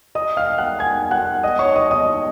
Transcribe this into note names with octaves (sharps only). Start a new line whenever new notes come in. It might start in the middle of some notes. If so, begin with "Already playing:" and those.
D#5 D#6
F5 F6
F#5 F#6
G#5 G#6
F#5 F#6
D#5 D#6
C#5 C#6
D#5 D#6
D#5 D#6